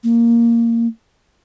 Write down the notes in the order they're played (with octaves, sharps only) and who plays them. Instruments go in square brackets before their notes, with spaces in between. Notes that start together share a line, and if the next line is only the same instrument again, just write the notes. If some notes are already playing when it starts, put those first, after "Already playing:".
[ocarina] A#3